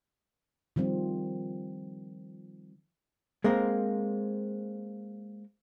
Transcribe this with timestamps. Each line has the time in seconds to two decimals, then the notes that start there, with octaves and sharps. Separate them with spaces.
0.76 D#3 F3 G3 C4
3.44 G#3 A#3 C4 A#4